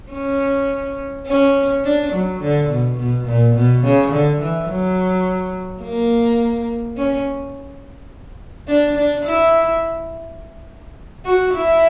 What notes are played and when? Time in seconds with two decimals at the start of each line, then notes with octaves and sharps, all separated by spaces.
0.12 C#4
1.27 C#4
1.84 D4
2.12 F#3
2.40 D3
2.69 B2
2.97 B2
3.26 A#2
3.55 B2
3.84 C#3
4.12 D3
4.41 E3
4.69 F#3
5.83 A#3
6.97 C#4
8.68 D4
8.97 D4
9.25 E4
11.25 F#4
11.54 E4